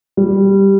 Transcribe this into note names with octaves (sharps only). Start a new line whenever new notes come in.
G3